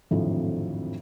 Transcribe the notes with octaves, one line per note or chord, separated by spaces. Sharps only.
G#1 F2 A2 D3 F3 F#3